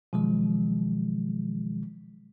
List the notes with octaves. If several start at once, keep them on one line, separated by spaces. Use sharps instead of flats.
B2 D#3 F3 F#3 G#3